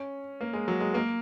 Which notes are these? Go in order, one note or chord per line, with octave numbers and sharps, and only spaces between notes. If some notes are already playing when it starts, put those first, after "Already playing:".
Already playing: C#4
A#3
G#3
F#3
G#3
A#3